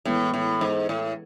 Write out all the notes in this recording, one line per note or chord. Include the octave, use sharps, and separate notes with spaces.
A2 E3 G#3 B3
A2
G#2
A2